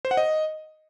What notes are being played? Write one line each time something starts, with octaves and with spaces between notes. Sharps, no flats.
C5
F#5
D#5